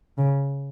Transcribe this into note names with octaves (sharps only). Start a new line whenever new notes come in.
C#3